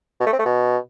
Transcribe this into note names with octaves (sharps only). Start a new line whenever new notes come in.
B2
A3
C4
A3
B2